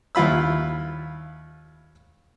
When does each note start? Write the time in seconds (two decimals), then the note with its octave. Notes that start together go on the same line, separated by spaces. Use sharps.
0.15 D#2 E4 F4 B5 E6